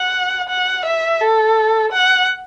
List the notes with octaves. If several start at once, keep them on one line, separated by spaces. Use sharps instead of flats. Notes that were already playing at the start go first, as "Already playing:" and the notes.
Already playing: F#5
F#5
E5
A4
F#5